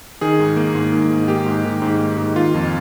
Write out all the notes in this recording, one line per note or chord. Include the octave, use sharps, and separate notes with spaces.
D#3 G#4
G#2
A#3
G#2
D#3
G#2
A#3 G4
G#2
D#3
G#2
A#3
G#2
D#3 F4
F2